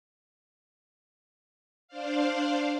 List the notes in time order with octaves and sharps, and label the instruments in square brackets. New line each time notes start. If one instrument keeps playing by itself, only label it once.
[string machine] D4 C5 D5 F5